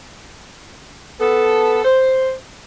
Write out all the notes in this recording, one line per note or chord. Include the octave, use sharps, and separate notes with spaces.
B3 A4
C5